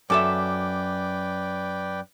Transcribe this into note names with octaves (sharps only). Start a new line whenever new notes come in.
F#2 A4 B4 D5 E5 G5 D6